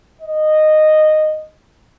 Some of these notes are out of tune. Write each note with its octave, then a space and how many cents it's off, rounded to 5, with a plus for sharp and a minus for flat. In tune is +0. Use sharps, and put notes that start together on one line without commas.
D#5 -10